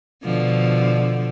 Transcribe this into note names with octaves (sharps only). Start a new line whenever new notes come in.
B2 D3 F3